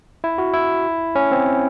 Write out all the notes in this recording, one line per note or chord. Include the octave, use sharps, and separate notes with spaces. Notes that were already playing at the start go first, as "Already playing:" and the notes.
E4
F#4
E4
C#4
C4